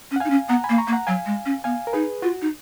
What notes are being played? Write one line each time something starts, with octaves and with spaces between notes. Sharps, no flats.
C#4
F#5
D#4 F5 G#5
C#4
B3 F#5 A#5
G#5 B5
A#3
A#5 C#6
A#3
F#5 A#5
F#3 F5 G#5
G#3
C#4
B3 F5 G#5
A#4
D#4 G#4 B4
F4 F#4
D#4